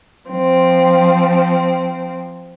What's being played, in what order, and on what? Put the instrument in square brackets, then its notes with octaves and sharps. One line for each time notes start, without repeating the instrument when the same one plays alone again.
[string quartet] F3 C4